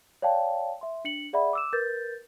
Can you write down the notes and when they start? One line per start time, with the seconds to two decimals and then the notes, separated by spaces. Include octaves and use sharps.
0.22 C#5 D5 F5 G5 A5
0.81 E5 C6
1.05 D4 C#7 F#7
1.33 G#4 D5 E5 F#5 B5
1.53 D6 E6 E7
1.73 A#4 B4 G6 A6